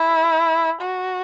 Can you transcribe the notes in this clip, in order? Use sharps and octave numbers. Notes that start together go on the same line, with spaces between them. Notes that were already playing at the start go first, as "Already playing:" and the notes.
Already playing: E4
F#4